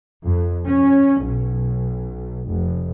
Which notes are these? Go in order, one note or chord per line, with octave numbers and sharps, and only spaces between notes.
F2
C#4
B1
F1